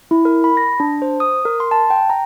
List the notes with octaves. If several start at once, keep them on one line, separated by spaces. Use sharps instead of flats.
E4
A#4
B5
A#6
D4
C5
D#6
A#4
C6
A5
G5
A#5